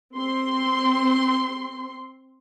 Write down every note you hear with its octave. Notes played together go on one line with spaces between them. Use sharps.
C4 C6